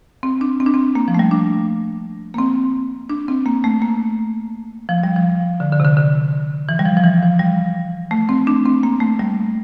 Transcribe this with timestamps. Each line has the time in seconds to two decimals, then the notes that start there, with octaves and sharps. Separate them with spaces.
0.23 C4
0.41 D4
0.60 C4
0.66 D4
0.74 C4
0.95 A#3
1.08 F3
1.14 A3
1.19 G3
1.31 D4
2.34 A#3
2.38 C4
3.10 D4
3.28 C4
3.46 A#3
3.64 A3
3.82 A#3
4.89 F3
5.03 G3
5.16 F3
5.60 D3
5.72 D3
5.80 C3
5.85 D3
5.97 D3
6.69 E3
6.79 G3
6.85 F3
6.97 F3
7.04 E3
7.22 F3
7.39 G3
8.11 A3
8.29 C4
8.47 D4
8.65 C4
8.83 A#3
9.00 A3
9.19 G3